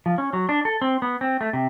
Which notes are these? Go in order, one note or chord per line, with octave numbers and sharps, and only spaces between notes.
F3
C#4
F#3
D4
A4
C4
B3
C4
A3
C3